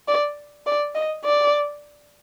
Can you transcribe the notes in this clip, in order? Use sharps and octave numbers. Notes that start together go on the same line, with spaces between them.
D5
D5
D#5
D5